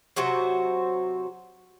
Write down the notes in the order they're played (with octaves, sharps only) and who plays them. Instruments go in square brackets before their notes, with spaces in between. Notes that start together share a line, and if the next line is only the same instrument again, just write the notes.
[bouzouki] C3 F#3 F#4 C5